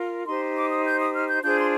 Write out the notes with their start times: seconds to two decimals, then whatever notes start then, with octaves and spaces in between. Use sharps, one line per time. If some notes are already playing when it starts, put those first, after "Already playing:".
Already playing: F4 A#4
0.26 D#4 G4 C5 C6
0.56 D6
0.70 D#6
0.85 G6
0.99 D#6
1.13 F6
1.28 G6
1.42 D4 F4 G#4 C5 G6
1.57 C6